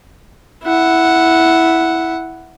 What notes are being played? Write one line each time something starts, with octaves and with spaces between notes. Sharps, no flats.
E4 F#5